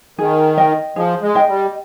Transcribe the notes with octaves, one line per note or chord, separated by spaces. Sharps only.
D#3 G#4
D#5 G5
F3 G#4
G#3
D#5 G5
G3